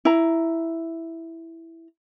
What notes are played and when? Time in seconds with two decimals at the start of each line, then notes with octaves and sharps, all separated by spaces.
0.05 E4 A#5